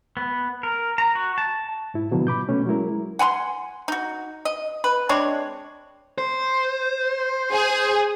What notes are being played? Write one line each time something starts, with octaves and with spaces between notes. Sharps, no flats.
B3
A#4
A#5
F#4
A5
G#2 E4
B2 D3 F3 F#3
B5 D6 G6
B2 A3 C#4
F#3 G#3 E4 A#4
F#5 G#5 B5 C6
D#4 F#4
D#5
B4
G#3 C4 D4 C#5
C5
G#4